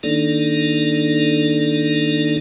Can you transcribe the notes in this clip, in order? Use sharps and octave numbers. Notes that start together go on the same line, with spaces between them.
D#3 A#3 D4 D#4 A4 D5